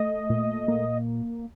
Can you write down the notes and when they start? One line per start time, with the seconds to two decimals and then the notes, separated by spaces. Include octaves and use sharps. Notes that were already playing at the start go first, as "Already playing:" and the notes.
Already playing: A3 D#5
0.30 A#2
0.68 A#3